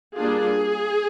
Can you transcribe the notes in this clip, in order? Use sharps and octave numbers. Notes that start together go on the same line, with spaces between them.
G3 A#3 D4 F4 G#4